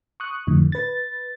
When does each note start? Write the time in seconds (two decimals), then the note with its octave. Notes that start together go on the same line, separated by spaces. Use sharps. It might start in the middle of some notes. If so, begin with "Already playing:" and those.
0.20 C#6 D#6 F#6
0.47 F2 A2 D3
0.72 B4 A6